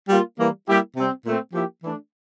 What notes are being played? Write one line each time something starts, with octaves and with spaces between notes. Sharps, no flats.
G3 A#3 F4
E3 G3 A#3
G3 A#3 E4 G4
C3 G3 C4
A#2 A3 C4
F3 A#3 E4 G4
E3 A3 D4